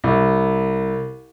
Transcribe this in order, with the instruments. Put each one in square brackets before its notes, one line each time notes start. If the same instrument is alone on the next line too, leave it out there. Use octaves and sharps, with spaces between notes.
[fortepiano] C2